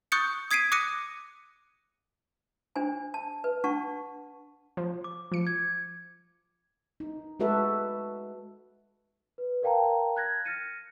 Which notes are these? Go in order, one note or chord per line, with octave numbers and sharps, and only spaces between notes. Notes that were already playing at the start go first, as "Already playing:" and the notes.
C#6 D#6 F#6 G6 A6 C#7
D#6 G#6 B6 C7 D7 D#7
D6 D#6 F#6 A#6 C#7 D#7
D4 C5 G#5
A5
B4
D4 F#5 A5 C#6
F3
D6
F3 C#7
G#6
D#4
G#3 F#4 A4 B4 E5
B4
A#4 D5 F5 G5 A5 A#5
F#6 G#6 A#6
F6 A6 A#6 C#7 D#7